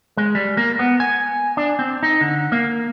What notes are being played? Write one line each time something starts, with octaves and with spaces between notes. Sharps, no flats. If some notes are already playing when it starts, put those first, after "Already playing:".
G#3
G3
A#3
B3
G#5
D4
C4
D#4
D3
A#3